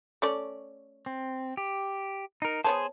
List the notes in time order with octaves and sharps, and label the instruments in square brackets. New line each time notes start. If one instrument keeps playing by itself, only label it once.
[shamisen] A3 C#4 D5
[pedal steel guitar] C4
G4
D#4 A#4
[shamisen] B3 C#5 A5 [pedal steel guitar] G#4 C5